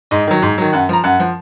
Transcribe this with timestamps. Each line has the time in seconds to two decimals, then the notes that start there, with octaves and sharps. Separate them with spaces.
0.11 G#2 D#5
0.27 D#3 F#3
0.42 G#2
0.58 D#3 F#3
0.73 F#2 F#5
0.89 F3 A#5
1.04 F#2 F#5
1.20 F3